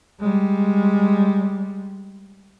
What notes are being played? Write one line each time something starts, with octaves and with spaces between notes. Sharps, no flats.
G3 G#3